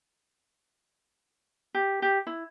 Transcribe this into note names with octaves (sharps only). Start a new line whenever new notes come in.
G4
G4
E4